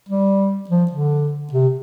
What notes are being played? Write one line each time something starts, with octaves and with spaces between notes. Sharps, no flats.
G3
F3
D3
C3